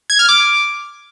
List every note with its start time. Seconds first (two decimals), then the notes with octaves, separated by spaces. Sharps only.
0.10 G#6
0.19 F6
0.29 D6